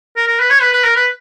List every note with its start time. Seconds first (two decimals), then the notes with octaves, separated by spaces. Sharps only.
0.16 A#4
0.27 A#4
0.40 B4
0.50 C#5
0.61 B4
0.73 B4
0.84 A#4
0.96 B4